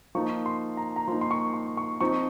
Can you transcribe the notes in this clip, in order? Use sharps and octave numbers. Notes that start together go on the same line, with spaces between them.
F3 A#3 D#4 C#6
C6
A#5
A#5
F3 A#3 D#4 C6
C6
C#6
C#6
C#6
F3 C4 D#4 C#6